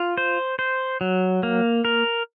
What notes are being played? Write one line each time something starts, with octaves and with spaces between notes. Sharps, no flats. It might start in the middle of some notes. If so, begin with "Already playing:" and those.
Already playing: F4
C5
C5
F#3
A#3
A#4